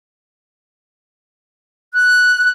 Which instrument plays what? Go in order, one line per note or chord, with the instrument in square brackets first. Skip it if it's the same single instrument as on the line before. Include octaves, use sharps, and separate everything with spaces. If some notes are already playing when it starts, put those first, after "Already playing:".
[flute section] F#6